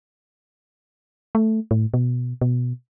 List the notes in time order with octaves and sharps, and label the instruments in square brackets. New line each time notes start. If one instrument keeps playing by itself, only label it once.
[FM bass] A3
A2
B2
B2